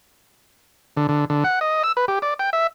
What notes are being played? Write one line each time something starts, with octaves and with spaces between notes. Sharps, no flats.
D3
D3
D3
F#5
D#5
E6
B4
G4
D5
G5
E5